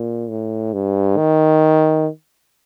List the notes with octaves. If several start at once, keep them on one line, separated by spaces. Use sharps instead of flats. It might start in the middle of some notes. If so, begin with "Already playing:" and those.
Already playing: A#2
A2
G2
D#3